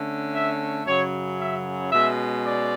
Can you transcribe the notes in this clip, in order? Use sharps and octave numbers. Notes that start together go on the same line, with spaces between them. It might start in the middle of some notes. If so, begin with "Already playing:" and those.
Already playing: D3 A3 C#4
E5
F#2 C#3 F#3 C#5
E5
B2 G#3 C#4 E5
D5